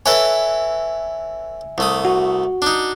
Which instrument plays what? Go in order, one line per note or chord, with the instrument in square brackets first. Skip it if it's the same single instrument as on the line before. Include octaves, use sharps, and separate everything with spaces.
[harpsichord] A4 B4 C#5 [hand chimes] E5 G#5
[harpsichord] C2 A3 D#6
[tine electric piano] F#4
[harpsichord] D4 D#4